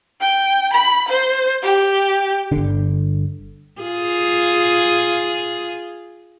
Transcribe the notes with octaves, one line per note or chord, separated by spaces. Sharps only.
G5
B5
C5
G4
G1 D3
F4 G#4